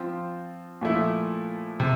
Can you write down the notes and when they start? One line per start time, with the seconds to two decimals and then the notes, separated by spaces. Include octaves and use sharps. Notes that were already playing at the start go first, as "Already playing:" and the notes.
Already playing: F3 C4 F4 C5
0.81 A#2 F3 A3 E4
1.80 C3